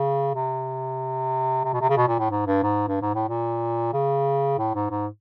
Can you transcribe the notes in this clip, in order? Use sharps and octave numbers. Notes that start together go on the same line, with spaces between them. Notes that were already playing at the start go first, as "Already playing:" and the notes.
Already playing: C#3
C3
C3
B2
C3
C#3
B2
A#2
A2
G#2
G2
G#2
G2
G#2
A2
A#2
C#3
A2
G#2
G#2